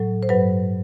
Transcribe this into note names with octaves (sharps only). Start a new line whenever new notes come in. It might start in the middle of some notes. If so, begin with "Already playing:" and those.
Already playing: A2 F#3 A4
C5
G2 F#3 B4